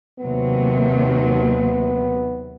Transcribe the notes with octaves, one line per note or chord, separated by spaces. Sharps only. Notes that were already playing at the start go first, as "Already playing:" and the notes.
D#2 C3 F#3 B3